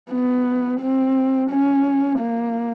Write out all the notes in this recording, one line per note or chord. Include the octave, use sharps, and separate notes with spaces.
B3
C4
C#4
A#3